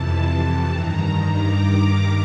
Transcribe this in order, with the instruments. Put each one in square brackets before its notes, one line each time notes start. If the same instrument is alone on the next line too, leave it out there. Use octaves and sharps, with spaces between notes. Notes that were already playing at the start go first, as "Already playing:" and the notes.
Already playing: [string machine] F2 C3 E3 A5
G2 D#3 A#5
D6